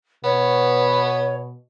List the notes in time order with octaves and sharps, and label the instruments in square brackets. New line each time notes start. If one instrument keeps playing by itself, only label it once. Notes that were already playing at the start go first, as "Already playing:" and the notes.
[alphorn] B2 [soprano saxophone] B3 [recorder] C#5